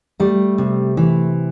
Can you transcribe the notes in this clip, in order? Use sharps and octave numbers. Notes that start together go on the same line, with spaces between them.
G3 A3
C3
E3